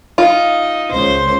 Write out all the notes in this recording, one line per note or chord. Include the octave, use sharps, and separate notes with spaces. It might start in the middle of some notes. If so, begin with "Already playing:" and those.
D#4 F4
C#2 C#3 C5